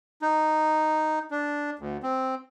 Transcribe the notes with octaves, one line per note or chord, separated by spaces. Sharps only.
D#4
D4
D2
C4